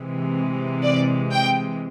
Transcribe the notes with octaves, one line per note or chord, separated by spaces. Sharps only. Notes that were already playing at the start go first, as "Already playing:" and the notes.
Already playing: C3 E3 G#3
D5
G5